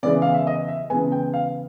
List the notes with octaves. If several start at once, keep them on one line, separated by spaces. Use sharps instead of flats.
C#3 E3 G#3 B3 D5
F5
E5
D#5
E5
C#3 E3 G#3 B3 G#5
G5
F5